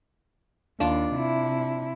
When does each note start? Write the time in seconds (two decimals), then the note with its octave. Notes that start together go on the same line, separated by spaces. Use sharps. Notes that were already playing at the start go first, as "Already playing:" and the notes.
0.80 D#2 D4 F4
1.14 C3 E4